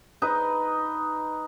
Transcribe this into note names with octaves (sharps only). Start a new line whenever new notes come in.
D#4 B4